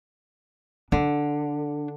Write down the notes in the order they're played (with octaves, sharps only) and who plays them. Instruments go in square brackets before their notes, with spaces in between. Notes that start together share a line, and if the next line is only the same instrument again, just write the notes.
[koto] D3 [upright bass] D4